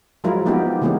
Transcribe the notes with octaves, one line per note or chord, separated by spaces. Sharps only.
F3 F#3 G#3 E4 F4 A#4
A#3 B3 D#4 E4 G4
C#3 E3 G#3 A#3 B3 C#4